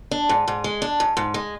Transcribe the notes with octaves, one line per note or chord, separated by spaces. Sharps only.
D4
G#2
G#2
G#3
D4
G#2
G#2
G#3